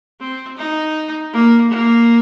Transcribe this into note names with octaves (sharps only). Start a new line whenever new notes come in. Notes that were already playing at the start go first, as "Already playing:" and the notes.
C4
D#4
A#3
A#3